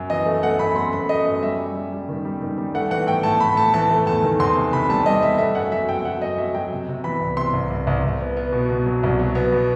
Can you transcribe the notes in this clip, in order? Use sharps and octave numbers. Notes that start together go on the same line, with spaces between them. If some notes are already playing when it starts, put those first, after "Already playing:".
Already playing: F#2
E3 D#5
A3
A3 F#5
F#2 B5
A3 C6
F#2 B5
A3 D#5
F#2 D#5
G3 E5
G3
G3
G3
D#3
G3
D#3
G3
A3 F#5
E3 F#5
A2 G5
A2 A5
A2 B5
A2 A5
E3 A5
A3
E2 A5
D#3
E2 C6
C3
C3 B5
G3 A5
G3 D#5
G3 E5
A3 E5
F#2 F#5
F#3 E5
F#2 G5
F#3 F#5
F#2 D#5
F#3 E5
F#3 G5
C3
C3
E3 B5
C2
C3 C6
C2
C2
C2
C2
B3
B3
B2
B2
F#3
C2
F#3
B3
B2